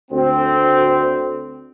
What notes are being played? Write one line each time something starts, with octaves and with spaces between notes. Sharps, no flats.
D2 C4